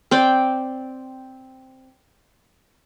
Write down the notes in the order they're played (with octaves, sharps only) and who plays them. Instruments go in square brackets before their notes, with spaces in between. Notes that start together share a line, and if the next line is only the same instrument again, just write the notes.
[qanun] C4 D5 G5